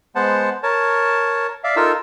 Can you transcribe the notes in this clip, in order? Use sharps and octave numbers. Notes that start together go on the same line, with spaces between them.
G#3 B3 C5 F#5 A5
A#4 C#5 A5
D5 E5 F5
D#4 F4 A4 A#4 E6